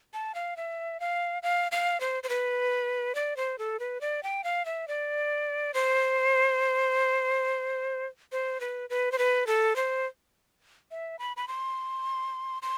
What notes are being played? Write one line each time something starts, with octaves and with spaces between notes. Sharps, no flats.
A5
F5
E5
F5
F5
F5
C5
C5
B4
D5
C5
A4
B4
D5
G5
F5
E5
D5
C5
C5
B4
B4
C5
B4
A4
C5
E5
B5
B5
C6
C6